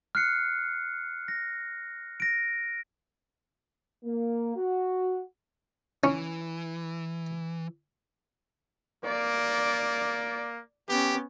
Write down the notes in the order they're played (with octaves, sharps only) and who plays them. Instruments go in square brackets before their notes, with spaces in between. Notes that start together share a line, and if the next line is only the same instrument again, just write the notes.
[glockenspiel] F6 F#6 C7 C#7
A#6
A#6 D7
[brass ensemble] A#3
F#4
[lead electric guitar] E3 [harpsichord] C#4
[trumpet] A#3 [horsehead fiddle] D5
[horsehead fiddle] B3 C#4 [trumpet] G4